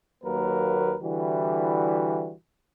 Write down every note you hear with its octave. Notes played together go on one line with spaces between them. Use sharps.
D#2 F#3 A#3 A#4 B4
D3 E3 G3 E4 F#4